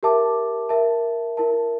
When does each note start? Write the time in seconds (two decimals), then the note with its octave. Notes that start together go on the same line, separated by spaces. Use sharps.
0.03 G4 A#4 E5 A5 D6
0.69 A#4 E5 A5
1.37 E4 A#4 E5 A5